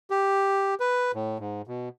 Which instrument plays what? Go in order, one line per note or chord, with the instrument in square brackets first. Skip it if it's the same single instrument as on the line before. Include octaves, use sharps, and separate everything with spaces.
[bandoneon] G4
B4
A2
G#2
B2